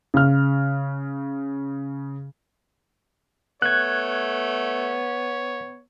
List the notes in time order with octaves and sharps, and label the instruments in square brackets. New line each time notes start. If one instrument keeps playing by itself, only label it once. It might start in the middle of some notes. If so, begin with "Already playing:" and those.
[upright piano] C#3 F6
[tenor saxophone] A3 [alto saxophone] B3 [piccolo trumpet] C#5 [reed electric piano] F#6 G#6